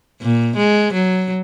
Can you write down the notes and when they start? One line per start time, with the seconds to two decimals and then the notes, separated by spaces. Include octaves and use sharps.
0.22 A#2
0.57 G#3
0.93 F#3